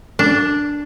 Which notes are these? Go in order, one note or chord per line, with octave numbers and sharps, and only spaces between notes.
D4